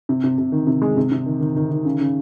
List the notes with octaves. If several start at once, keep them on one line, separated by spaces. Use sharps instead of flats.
C3
C3
C3
D#3
C3
G#3
C3
C3
D#3
D#3
D#3
D#3
C#3
C#3